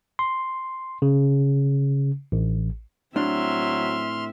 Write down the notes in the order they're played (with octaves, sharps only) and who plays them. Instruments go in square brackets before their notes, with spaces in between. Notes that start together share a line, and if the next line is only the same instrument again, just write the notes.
[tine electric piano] C6
C#3
A1
[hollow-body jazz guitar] A2 D4 [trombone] F#3 [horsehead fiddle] C4 E5 [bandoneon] C6 F6